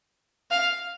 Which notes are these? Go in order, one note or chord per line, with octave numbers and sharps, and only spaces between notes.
F5